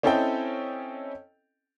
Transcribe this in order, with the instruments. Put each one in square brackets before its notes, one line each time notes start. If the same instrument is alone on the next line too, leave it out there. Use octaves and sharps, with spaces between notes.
[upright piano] C4 C#4 E4 A4 D#5 G5